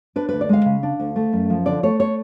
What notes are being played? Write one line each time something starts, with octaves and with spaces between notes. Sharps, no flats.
D4 B4
D2 B4
D5
G#3 F5
C#3
D4
D2
A3
F#2
F3
D3 D5
A3 C#5
C#5